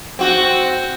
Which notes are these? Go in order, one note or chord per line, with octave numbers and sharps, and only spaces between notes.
C4 F#4